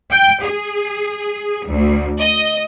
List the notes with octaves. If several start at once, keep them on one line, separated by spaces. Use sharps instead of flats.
G5
G#4
D2
D#5